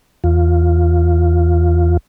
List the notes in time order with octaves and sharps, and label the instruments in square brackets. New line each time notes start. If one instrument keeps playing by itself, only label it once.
[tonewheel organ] E2 F4